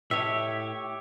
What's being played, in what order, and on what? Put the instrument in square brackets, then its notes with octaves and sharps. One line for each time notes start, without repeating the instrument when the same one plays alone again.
[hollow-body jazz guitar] A2 D#5 [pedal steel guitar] G4 C#5 E5